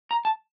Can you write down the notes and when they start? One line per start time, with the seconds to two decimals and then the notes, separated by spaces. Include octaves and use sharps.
0.11 A#5
0.25 A5